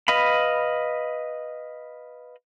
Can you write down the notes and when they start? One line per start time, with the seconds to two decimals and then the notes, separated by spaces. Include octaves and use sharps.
0.08 B4 D#5 F5 B5